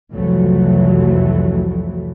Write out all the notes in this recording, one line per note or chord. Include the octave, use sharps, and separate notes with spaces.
C2 F2 C3 E3 F#3 A3